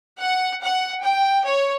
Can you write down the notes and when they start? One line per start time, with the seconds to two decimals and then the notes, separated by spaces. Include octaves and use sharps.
0.20 F#5
0.62 F#5
1.02 G5
1.46 C#5